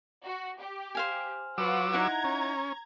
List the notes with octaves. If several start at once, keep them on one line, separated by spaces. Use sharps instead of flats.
F#4
G4
C5 F5 G#5
F#3 F4 B4 F#5 D6 E6
D#4 E4 F#5 A#5 G#6
C#4